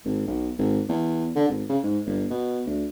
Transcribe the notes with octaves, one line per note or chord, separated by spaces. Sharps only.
G#1
B1
G#1
E2
D3
G#1
C#3
G#2
G1
B2
D2